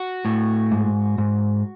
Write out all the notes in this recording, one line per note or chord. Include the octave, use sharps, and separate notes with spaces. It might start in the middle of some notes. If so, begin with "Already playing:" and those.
Already playing: F#4
A2
G#2
G#2